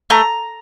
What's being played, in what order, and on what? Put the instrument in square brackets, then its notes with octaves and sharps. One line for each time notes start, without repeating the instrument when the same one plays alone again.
[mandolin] A3 A#5